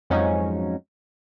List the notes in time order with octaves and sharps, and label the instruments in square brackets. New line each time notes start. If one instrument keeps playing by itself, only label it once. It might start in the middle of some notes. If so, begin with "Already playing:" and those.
[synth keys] F2 G#2 F3 F#3 C#4 D#4